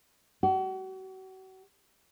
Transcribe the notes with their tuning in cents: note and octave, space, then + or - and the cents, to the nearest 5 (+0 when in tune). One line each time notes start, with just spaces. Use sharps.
F#4 +40